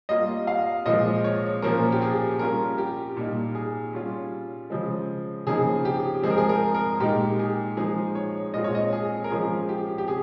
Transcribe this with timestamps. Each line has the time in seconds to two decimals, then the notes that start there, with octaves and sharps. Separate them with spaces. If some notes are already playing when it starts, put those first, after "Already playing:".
0.09 G3 A#3 F4 D#5
0.47 F5
0.86 A#2 F3 G#3 D#5
1.24 C#5
1.62 A#2 F3 A#3 C#4 A#4
1.92 G4
2.02 G#4
2.39 G3 C#4 F4 A#4
2.78 G4
3.17 A#2 G3 A#3 D#4
3.55 G#4
3.93 G3 C#4 F4
4.70 C#3 F3 G#3
5.47 C#3 F3 A#3 D#4 G#4
5.85 G4
6.23 F3 G#3 C4 G#4
6.30 A#4
6.38 G#4
6.49 A#4
6.75 A#4
7.00 A#2 G#3 D#4 G4
7.39 G#4
7.77 F3 G#3 D#4 G#4
8.15 C#5
8.54 A#2 G#3 C4 F4 D#5
8.64 C#5
8.75 D#5
8.92 G#4
9.24 A#4
9.30 F3 G#3 C#4 F4 G#4
9.69 G4
9.98 G4
10.07 C3 G#4